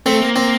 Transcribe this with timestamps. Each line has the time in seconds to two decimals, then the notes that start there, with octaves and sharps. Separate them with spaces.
0.06 A3 C4
0.22 A#3
0.36 C4